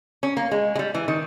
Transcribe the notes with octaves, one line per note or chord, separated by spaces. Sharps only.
C#4
A#3
G#3
G#3
G3
E3
D#3